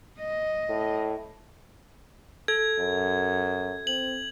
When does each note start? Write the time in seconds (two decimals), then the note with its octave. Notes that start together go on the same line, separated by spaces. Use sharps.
0.19 D#5
0.69 A2
2.48 A4 G#6
2.80 F#2
3.87 C4 F#7